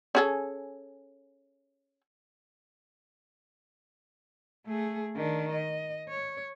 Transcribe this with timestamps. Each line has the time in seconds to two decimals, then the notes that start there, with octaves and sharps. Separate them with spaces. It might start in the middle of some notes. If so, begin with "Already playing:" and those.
0.15 C#4 G#4 A4
4.66 A3 G#4
5.16 D#3 D4
5.52 D#5
6.09 C#5